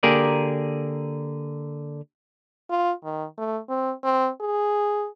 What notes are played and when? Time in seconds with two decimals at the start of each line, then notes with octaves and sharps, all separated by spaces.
0.03 D3 A#3 G4 G#4 A#4 D5
2.70 F4
3.04 D#3
3.38 A3
3.69 C4
4.04 C4
4.41 G#4